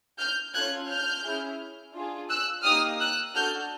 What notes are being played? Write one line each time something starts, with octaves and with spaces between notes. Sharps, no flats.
F6 G6
C#4 F4 A4 F#6 G#6
F6 G6
C#4 E4 G#4
D4 F4 G#4
E6 F#6
A#3 D#4 G4 D#6 F6
E6 F#6
D4 F#4 A4 F6 G6